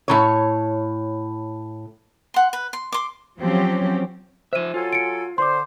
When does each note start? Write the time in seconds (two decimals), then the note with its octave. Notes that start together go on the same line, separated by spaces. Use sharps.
0.08 A2 E3 C#5
2.34 F#5 C6
2.53 B4
2.73 C6
2.92 C6 D6
3.38 F3 F#3 C4 C#4 G4
4.53 F3 C5 E5 D#7
4.74 F#3 F4 A4 G#5
4.93 C#7 D7
5.38 D3 C5 C6 D6